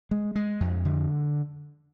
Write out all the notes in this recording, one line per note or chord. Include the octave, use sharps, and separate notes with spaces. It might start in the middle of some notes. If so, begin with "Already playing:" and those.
G#3
G#3
F2
D3